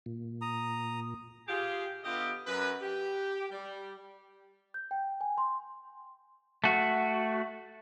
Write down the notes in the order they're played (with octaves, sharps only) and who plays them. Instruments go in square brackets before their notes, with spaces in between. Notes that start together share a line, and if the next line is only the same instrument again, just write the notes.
[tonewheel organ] A#2
[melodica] A#5 D#6
[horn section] F4 G4 G#4
D3 B3 F4 G4 D#5 E5
F#2 B4
G4
G3
[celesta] G6
G5
G#5
C6
[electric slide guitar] A3 F#4